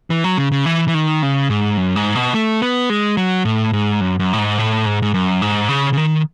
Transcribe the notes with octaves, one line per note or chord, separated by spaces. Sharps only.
E3
F#3
C#3
C#3
E3
E3
D#3
C#3
G#2
F#2
G#2
B2
A3
B3
G#3
F#3
A2
G#2
F#2
F#2
A2
G#2
A2
G#2
G#2
F#2
G#2
C#3
C#3
D#3